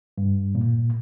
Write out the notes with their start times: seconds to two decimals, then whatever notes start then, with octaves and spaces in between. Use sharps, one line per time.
0.18 G2
0.55 A#2